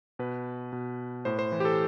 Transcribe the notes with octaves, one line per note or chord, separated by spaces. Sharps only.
B2 B4
B2
A2 C5
C5
E3
G4
A4